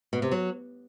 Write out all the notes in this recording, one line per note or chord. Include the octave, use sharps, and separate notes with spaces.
B2
C3
F#3